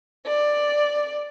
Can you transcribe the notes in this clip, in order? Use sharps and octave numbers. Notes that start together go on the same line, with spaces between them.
D5